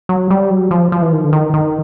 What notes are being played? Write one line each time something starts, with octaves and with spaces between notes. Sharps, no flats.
F#3
G3
F#3
F3
F3
E3
D#3
D3
D#3
D#3